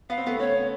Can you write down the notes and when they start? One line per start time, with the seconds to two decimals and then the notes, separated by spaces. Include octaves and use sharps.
0.09 B3 F5
0.18 C4
0.26 A3 B3
0.40 B3 C#4 C#5